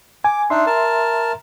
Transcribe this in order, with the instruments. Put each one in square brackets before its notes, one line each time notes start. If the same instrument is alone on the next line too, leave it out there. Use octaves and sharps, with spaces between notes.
[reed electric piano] G#5 [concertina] D6
[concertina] D4 D#4 [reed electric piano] E5 C6
[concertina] A#4 A5